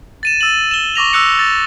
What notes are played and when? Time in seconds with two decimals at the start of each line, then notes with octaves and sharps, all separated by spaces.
0.23 A6 D#7 E7
0.41 E6 A6 F#7
0.71 E7 G7
0.96 C#6 D6 A#6 F7
1.13 E6 F#6 C#7
1.39 A6